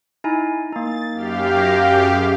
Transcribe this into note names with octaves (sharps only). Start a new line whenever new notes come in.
D#4 E4 G#5
A#3 D#4 A6
F#2 G4 F5
G6 A#6
C#4 G#4